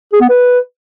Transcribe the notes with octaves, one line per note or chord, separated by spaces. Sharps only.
G#4
B3
B4